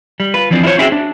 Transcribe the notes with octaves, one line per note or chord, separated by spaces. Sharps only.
G3
F4 B4
E3 F3 C4 D4
E4 F4 G#4 C5 C#5
C#4 E4 F#4 G#4 E5 G5
D4